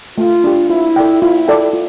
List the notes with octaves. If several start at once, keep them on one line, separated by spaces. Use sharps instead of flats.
A3 F4
D4 G4
E4 F4
A4 D5 G5
E4 F4
A4 D5 G5
F4